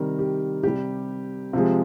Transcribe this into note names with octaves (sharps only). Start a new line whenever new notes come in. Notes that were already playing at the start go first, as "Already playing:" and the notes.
Already playing: C3 D#3 G3 A#4
G4
C3 G3 G4
C3 F3 G#3